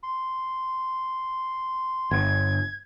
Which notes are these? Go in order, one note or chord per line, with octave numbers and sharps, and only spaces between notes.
C6
G1 G#6